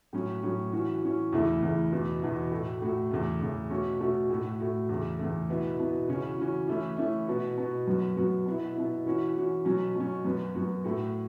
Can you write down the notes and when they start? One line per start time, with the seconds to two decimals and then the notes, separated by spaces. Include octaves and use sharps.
0.13 A2 F#3 C#4
0.43 A2 F#3 C#4
0.73 E3 C#4 F#4
1.02 E3 C#4 F#4
1.32 E2 C#3 A3 E4
1.62 E2 C#3 A3 E4
1.91 E2 B2 B3 E4
2.22 E2 B2 B3 E4
2.51 A2 A3 F#4
2.82 A2 A3 F#4
3.11 E2 C#3 A3
3.41 E2 C#3 A3
3.70 B2 A3 C#4 F#4
4.00 B2 A3 C#4 F#4
4.30 A2 A3 F#4
4.60 A2 A3 F#4
4.89 E2 C#3 A3
5.19 E2 C#3 A3
5.49 B2 B3 E4
5.79 B2 B3 E4
6.08 C#3 E3 C#4 F#4
6.38 C#3 E3 C#4 F#4
6.68 E3 A3 C#4 E4
6.97 E3 A3 C#4 E4
7.27 B2 B3 F#4
7.58 B2 B3 F#4
7.87 F#2 F#3 B3 F#4
8.17 F#2 F#3 B3 F#4
8.46 B2 B3 E4
8.75 B2 B3 E4
9.06 E3 C#4 F#4
9.36 E3 C#4 F#4
9.65 B2 F#3 C#4
9.95 B2 F#3 C#4
10.25 F#2 F#3 B3 F#4
10.55 F#2 F#3 B3 F#4
10.84 A2 A3 F#4